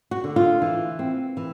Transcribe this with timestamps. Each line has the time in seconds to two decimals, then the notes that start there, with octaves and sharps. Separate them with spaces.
0.11 F#4
0.24 D3
0.36 F4
0.62 E3
0.99 C4
1.37 E3